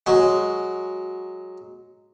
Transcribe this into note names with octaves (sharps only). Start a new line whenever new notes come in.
F#3 G#3